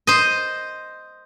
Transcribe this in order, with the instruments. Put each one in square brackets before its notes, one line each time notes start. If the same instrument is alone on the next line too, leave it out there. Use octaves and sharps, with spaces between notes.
[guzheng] C5 D#5